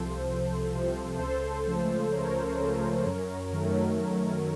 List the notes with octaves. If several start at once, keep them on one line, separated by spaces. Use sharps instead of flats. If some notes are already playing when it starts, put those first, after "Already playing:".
Already playing: C2 C3 F3 A4 C5
C2
C3 F3
C#2 A4 C5
C#3 F3 A3
C#2 A#4 C#5
C#3 F3 A3
F#2
D#3 F#3 A3
F#2